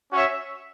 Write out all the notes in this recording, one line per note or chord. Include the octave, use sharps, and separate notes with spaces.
C#4 F#4 C#5 E5